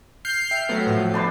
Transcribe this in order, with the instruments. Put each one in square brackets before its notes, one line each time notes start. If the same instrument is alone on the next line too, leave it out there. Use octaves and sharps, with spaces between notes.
[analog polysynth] F6 G6 C7
[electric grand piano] E5 G5
[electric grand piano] F#3 A3 [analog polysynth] B3
[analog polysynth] A2 F3
[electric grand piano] G1 [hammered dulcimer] D4 B4 C5